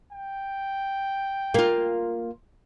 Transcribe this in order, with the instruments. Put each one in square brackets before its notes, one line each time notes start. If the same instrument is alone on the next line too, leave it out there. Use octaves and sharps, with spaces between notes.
[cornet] G5
[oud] A#3 F4